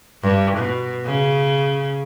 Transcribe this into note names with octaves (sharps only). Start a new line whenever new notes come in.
G2
B2
C#3